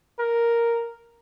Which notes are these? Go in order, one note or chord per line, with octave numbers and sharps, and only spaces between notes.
A#4